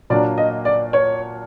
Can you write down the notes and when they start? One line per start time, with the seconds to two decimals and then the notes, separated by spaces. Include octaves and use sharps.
0.10 A#2 F#3 A#3 D4 D5
0.38 D#5
0.65 D5
0.93 C#5